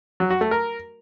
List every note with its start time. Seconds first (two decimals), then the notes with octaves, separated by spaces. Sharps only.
0.20 F#3
0.30 F#4
0.41 A3
0.51 A#4